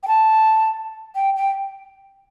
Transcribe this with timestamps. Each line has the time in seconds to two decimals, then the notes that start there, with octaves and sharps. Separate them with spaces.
0.03 G5
0.07 A5
1.15 G5
1.36 G5